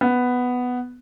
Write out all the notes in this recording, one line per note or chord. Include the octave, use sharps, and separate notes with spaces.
B3